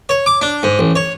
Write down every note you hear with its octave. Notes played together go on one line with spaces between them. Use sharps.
C#5
D6
D4
G#2
A1
C#5